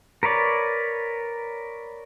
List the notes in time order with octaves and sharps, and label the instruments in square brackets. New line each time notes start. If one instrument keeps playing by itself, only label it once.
[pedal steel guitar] A#4 B4 C#5 D5